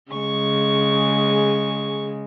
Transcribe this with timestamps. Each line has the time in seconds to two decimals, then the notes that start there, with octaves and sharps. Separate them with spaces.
0.12 C#3 G#3 C#6